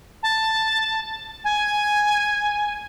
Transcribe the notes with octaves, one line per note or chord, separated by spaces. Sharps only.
A5
G#5